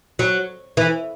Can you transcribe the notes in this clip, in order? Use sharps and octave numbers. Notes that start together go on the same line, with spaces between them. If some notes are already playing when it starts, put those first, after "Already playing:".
F#3
E3